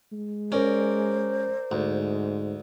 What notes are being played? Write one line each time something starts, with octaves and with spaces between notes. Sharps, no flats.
G#3
C#4 A#4 C5 D5
D2 G#2